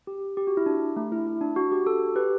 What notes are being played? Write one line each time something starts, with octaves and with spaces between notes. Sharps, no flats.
G4
G4
F#4
E4
D4
A3
E4
E4
D4
F#4
G4
F#4 A4
G4 B4